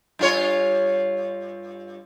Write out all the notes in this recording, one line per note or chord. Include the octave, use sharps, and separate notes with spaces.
G2 F4 C#5